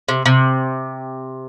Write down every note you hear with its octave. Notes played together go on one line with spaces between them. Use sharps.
C3
C3